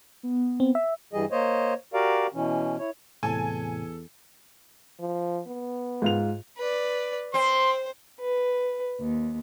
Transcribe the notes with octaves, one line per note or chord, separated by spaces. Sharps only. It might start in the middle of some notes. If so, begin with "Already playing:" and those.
B3
C4
E5
G2 E3 G3 G#4 D#5
A#3 C5 C#5 D#5
F#4 G4 A#4 D5 F5
B2 E3 C#4
E4 C#5
E2 A2 C3 A4 G#5
F3
B3
G#2 F4 F7
B4 D5
C4 C5 C6
B4
D#2